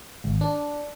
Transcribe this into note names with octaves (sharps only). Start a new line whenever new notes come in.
G#1
D4